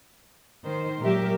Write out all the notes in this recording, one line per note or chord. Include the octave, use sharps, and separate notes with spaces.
D#3 C5
A#2 F#3 G#3 G4 A#4 E5